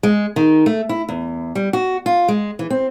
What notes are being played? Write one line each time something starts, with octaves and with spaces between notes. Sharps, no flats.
G#3
D#3
A3
E4
E2
G3
F#4
F4
G#3
E3
C4